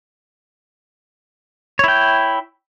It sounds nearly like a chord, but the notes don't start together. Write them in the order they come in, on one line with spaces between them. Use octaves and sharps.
C#5 E4 G5